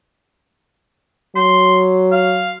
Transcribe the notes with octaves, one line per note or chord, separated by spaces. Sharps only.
F#3 C6
F5